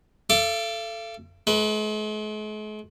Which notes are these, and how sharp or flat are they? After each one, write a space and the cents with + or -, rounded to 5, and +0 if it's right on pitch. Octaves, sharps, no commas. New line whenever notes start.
A4 +0 F5 -45 D6 +0
G#3 +45 B4 +0